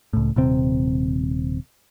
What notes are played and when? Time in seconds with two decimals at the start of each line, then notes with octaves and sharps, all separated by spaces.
0.13 C#2 A2
0.36 D#1 C3 C4